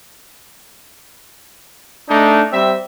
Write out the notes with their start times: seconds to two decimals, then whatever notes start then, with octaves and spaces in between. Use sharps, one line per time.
2.09 A3 D4 D#4
2.52 G3 C4 E5